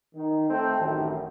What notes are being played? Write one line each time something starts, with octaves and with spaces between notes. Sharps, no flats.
D#3
A3 C4 A4 G5
A1 F#2 D#3